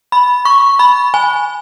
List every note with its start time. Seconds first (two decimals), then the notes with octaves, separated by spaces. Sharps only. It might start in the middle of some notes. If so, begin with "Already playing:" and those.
0.12 B5
0.45 C#6
0.79 B5
1.14 G#5